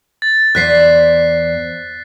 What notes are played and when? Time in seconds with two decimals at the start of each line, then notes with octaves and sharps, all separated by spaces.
0.22 A6
0.55 E2 C5 D5 F#6 B6 C7